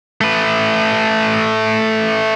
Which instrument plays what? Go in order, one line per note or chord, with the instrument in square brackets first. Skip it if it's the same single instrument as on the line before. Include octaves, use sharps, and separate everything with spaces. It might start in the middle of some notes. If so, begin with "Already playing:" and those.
[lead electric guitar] A3 B4